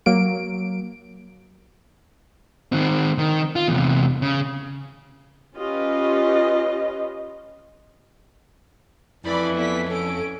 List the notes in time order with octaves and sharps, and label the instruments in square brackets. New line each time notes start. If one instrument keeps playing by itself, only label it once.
[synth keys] F#3 A#3 D7
[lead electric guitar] D#3 C4
D#3
F4
E2 C3
C#3
[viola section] C#4 F4 G4 B4 D#5
[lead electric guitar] F2 [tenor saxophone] E3 [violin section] A3 D5 B5 [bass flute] E4
[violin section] A3 E4 B6 [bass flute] B3
[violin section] C#4 D7 [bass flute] A4